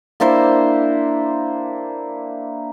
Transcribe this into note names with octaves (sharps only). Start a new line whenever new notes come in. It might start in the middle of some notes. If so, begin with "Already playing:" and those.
A#3 D4 E4 C5